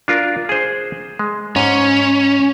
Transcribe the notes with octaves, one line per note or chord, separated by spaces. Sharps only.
D4 F4 A#4
G#4 C5
G#3
G#2 C#4